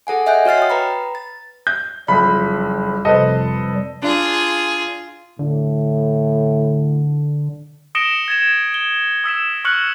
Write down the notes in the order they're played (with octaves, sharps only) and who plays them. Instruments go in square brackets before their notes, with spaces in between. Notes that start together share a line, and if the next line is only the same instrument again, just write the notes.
[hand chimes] G#4 A4 F#5 G#5
D#5 E5 F#5 G#5 F#6 G6
F#4 C#5 F6 A6 C7
G5 D#6
B4 A#5 B5
A6
[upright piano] G6
[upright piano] F#1 F2 [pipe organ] G3 [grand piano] B5
[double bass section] F1 F2 [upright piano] A4 B4 C5 [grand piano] D#5
[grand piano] D4 [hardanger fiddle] F4 G#4
[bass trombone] A2 [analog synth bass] D3
[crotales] D#6 A#6 C#7 D7 E7 G7
G#6 A6 E7
G7
D#6 E6 B6 E7
C#6 F6 F#6 C#7 F#7